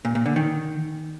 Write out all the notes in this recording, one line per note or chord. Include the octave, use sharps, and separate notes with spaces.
A#2
A#2
D3
D#3